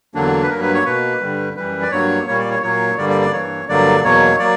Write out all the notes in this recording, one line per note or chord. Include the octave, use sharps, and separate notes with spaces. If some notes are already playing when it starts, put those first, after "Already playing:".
E2 D3 F#3 A#3 D4
B4
G2 F#3 A#3 A#4
B4
C#5
B2 A#3 B4
G2 D3 G3
F#2 E3 G3 B4
D5
G2 F#3 A#3 C#5
A#2 G3 A#3 C#5
D5
C#5
A#2 F#3 A#3 C#5
G2 D3 G3 A#3 D5
D5
D5
G2 E3 A#3 C#5
G2 D3 F#3 A#3 D5
E2 B2 F#3 A#3 C#5
F#3 A#3 D5